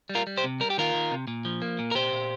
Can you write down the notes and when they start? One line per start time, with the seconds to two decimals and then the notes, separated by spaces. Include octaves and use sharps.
0.09 G3
0.15 F4 A#4
0.27 G3
0.37 G4 C5
0.44 C3
0.60 G3 A#4
0.70 G4
0.78 D#3 F4 A#4
0.94 D#3
1.11 C3
1.27 A#2
1.45 F3
1.62 A#3
1.79 A#2
1.91 A#4
1.95 A#2 G4 C5
2.13 A#2